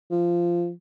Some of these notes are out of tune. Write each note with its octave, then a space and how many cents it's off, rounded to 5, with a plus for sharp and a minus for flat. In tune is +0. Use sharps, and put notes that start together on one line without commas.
F3 -10